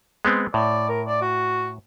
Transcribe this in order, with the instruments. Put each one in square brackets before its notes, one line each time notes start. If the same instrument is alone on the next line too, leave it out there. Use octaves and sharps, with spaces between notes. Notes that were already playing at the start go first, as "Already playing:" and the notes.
[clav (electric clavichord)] G#3 B3 C4
[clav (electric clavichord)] A2 [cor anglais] D5
[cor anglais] A#4
D5
F#4